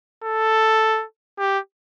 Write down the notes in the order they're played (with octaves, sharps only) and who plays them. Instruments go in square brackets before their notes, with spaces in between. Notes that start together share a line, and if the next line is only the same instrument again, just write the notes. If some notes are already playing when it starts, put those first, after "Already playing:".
[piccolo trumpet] A4
G4